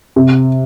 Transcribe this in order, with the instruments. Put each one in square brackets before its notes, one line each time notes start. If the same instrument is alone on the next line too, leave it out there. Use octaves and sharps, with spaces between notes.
[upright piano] C3